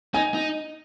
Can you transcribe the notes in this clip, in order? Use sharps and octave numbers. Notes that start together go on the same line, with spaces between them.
D#4 G#5
D#4